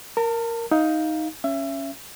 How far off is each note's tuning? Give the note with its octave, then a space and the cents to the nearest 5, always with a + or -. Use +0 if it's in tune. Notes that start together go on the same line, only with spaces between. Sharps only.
A#4 -5 A5 +40
D#4 +10 F5 +0
C#4 +0 E5 +25